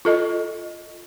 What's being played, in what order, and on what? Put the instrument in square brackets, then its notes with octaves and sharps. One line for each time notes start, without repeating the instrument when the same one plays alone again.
[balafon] F4 A4 D#5